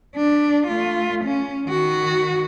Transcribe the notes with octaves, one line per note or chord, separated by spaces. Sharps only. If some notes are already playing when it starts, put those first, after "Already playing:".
D4
A3 F4
C#4
D#3 F#4